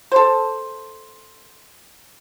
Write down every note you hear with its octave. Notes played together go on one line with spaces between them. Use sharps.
A4 C5